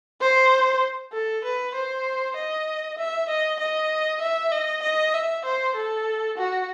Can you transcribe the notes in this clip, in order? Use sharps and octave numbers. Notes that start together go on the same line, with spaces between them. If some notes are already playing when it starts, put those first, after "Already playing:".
C5
A4
B4
C5
D#5
E5
D#5
D#5
E5
D#5
D#5
E5
C5
A4
F#4